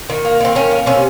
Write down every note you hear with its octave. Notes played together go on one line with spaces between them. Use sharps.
D#3
A#3
D#3 C4
A#3 C#4
A#3
C3 C#4